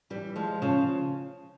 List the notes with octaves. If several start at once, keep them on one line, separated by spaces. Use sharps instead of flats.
E3 G3
F3 G#3
C#3 F3